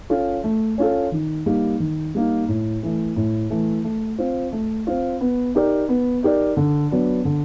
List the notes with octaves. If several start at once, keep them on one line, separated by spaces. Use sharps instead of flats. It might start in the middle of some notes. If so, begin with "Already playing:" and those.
C#4 F4 A4
A3
C#4 F4 A4
D#3
G3 A#3 D#4
D#3
G3 A#3 D#4
A2
E3 A3
A2
E3 A3
A3
C4 F4
A3
C4 F4
B3
D#4 G4 A#4 D5
B3
D#4 G4 A#4 D5
D3
F#3 B3 D4
D3